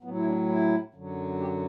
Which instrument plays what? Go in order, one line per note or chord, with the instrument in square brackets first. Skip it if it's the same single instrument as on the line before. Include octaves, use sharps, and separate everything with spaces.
[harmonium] A2 F#3 B3
E4
D4
E4
F#2 D3 F#3
G4